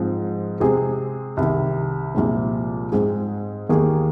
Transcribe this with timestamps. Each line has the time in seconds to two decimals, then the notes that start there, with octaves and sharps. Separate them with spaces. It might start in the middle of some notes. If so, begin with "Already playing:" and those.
Already playing: G#2 F3 C4
0.60 C3 G#3 C4 G#4
1.37 C2 C3 D#3
2.15 C2 A#2 F3 G#3 C4
2.92 G#2 G#3 C4 G#4
3.69 D#2 D#3 A#3 G#4